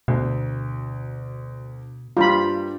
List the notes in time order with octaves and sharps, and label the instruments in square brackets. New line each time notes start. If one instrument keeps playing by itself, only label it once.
[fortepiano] D2 [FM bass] B2
[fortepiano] G2 G3 A#5 [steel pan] F4 B5